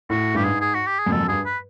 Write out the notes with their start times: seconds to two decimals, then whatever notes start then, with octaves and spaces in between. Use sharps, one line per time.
0.10 A2 F#4
0.35 G2 G4
0.44 G#2 G#4
0.61 G#4
0.75 F#4
0.86 G4
0.99 G#4
1.06 F#2
1.12 F2 A4
1.20 F#2
1.29 G2 G#4
1.46 B4